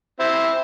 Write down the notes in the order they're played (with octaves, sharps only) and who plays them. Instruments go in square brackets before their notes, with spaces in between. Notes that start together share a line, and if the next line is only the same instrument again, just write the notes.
[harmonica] C4 E4